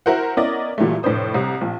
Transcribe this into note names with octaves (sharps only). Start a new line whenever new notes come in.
E4 F#4 A#4 C5 F#5
B3 C#4 E4 A#4 D5 D#5
A#2 E3 F#3 G3 A3
F1 A2 D4 B4 C5 D#6
C2 C3
A#1